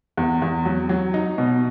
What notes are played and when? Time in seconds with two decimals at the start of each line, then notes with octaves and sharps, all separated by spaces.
0.17 E2
0.42 E2
0.65 F#3
0.89 F#3
1.14 D#4
1.38 B2